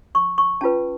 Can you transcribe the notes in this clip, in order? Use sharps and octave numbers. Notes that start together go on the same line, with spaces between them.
C#6
C#6
C#4 F4 B4 A5